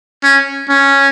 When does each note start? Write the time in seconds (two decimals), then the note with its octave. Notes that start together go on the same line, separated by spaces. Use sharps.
0.24 C#4
0.69 C#4